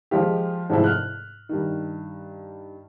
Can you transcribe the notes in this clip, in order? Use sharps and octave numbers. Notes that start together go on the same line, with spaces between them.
F3 G#3 F4 G4
G#2 C3 F3 G3 A3 E4
F6 F#6
G2 D#3